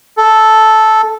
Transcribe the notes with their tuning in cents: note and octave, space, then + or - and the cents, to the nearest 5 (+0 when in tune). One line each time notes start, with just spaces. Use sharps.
A4 -5